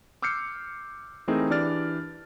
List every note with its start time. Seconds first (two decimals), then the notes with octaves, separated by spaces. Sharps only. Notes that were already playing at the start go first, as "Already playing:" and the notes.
0.22 D6 E6 F6 G6 C7 C#7
1.28 E3 A3 C4 D#4 G#4 A#4
1.50 E3 D4 G4 D5 F6 A6